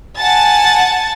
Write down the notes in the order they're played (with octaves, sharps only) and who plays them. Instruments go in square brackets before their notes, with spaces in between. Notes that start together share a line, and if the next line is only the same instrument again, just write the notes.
[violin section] F#5 G#5 A5 A6